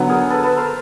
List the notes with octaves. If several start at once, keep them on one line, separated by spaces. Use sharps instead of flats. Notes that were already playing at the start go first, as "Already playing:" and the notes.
Already playing: D3 F#3 B3
G#4 A#4
A4 B4
A4 B4
A#4 C5